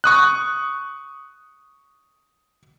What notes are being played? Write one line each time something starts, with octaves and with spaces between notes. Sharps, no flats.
C#6 D#6 F#6